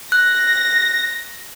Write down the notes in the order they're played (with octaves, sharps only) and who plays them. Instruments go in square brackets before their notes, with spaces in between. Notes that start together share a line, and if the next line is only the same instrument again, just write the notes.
[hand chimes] F#6 [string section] A#6